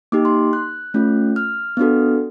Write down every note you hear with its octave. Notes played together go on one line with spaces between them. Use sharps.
A#3 D#4 G4 D6
C6
F#6
A3 C#4 F4
F6
B3 D4 F#4 A4